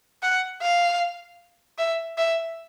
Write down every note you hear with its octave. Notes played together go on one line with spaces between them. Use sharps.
F#5
F5
E5
E5